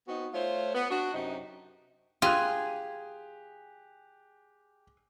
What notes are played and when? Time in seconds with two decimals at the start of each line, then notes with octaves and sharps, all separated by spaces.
0.08 B3 C4 D#4 F#4
0.34 A3 F4 C5 C#5
0.75 B3
0.90 D4 F#4
1.14 F#2 C3 D#4
2.22 F4 G4 G#4 F#6